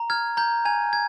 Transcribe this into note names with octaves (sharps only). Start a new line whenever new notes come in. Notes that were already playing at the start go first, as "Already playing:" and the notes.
Already playing: A#5
F6 G#6
A#5 G6
G#5 G#6
G#6